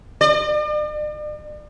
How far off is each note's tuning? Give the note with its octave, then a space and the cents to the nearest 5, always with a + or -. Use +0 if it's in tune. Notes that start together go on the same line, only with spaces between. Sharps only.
D5 +45